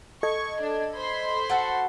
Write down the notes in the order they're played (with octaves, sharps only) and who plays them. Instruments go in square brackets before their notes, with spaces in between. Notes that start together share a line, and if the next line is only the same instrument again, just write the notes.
[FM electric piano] A4 D#5 G#6 [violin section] C#6
[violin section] D4
C5 B5 C6
[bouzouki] F#4 A4 F#5